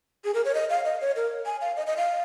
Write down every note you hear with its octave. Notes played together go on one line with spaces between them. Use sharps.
G#4
A#4
C#5
D#5
F5
D#5
C#5
A#4
G#5
F5
D#5
D#5
F5